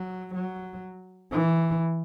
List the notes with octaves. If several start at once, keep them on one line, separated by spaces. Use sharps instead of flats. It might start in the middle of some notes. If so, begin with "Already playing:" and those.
Already playing: F#3
F#3
E3